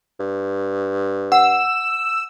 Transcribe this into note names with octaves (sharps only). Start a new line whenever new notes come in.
G2
F#5 E6